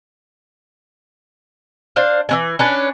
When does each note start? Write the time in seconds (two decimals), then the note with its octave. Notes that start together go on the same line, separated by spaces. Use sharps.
1.96 D4 C5 F5
2.29 E3 C#4 G#5
2.59 C#4 D4 B4